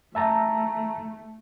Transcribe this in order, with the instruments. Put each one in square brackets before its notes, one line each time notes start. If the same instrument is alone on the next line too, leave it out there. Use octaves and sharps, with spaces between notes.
[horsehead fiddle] A3 [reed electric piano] E5 A5 A#5